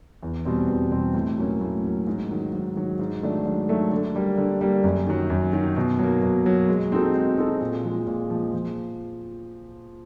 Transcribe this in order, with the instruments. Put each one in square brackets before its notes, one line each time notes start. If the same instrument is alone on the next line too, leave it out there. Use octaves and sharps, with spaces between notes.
[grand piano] E2
B2 G3 C4
E2
B2 G3 C4
A2
F#3 A#3 C#4
A2
F#3 A#3 C#4
G#2
D#3 F#3
G#2
D#3 F#3
G#2
D#3 F#3 A3 D4
G#2
D#3 F#3 A3 D4
D3
G3 A#3
D3
G3 A#3
F#2
D#3 F#3
F#2
D#3 F#3
B2
F#3 A#3
B2
F#3 A#3
G#3
C4 D#4 F#4 A4
G#3
C4 D#4 F#4 A4
A#2
F3 G#3
A#2
F3 G#3
F3